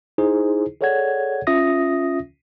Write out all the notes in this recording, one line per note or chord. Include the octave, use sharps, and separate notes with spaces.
D#4 E4 G#4 C5
G#4 A4 C#5 D5 F#5 G#6
C#4 F4 E5 D#6 A#6